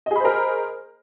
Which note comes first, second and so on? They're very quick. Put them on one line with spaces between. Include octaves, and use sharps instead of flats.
D#5 G#4 B5 C5 A#4